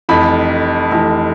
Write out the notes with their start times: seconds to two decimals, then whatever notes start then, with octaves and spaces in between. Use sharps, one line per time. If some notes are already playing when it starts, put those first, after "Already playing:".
0.09 F1 F2 E3 B5
0.91 F1 F2 E3